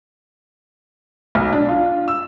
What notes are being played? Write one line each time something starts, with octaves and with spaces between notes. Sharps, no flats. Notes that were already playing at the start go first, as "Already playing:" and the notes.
B1
D4
F4
E6